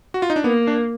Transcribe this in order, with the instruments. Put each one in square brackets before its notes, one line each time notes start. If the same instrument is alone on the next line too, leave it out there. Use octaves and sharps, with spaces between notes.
[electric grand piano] F#4
F4
D#4
D4
[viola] A#3 [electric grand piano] B3
[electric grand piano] D4